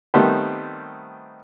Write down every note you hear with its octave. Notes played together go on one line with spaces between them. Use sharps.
D#3 G3 A3 B3 C4 C5